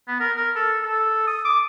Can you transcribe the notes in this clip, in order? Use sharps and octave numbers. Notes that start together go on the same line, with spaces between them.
B3
A#4
A#4
A4
A4
D#6
D6